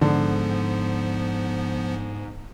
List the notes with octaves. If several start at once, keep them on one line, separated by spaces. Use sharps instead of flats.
G#2 D3 F3 B3